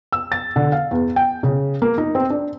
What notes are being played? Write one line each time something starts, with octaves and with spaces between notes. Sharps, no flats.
E6
A6
D3
F5
E2
G5
C#3
A#3
D#4
C4
D4